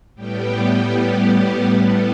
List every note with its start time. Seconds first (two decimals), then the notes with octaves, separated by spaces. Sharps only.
0.15 A2 G3 B3 G4
1.83 A4